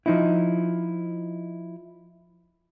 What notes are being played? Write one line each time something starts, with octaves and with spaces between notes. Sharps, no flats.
F3 D#4 E4